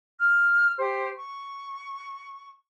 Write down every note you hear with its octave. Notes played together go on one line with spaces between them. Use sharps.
F6
G4 C5
C#6